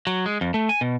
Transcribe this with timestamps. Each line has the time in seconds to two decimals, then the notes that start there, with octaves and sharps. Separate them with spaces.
0.07 F#3
0.26 G#3
0.41 F2
0.54 A3
0.69 G#5
0.81 B2